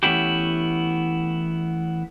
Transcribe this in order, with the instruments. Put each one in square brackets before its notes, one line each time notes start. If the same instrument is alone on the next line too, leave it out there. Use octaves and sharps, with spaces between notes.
[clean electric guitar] E3 A3 B3 C#4 E4 G4